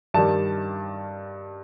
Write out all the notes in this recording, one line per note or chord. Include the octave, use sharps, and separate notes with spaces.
G2 D#3 G3 A5